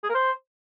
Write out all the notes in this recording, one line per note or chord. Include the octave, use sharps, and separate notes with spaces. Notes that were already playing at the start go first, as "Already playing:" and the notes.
G#4
A#4
C5